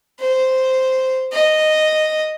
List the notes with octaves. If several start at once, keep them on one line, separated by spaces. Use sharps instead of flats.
C5
D#5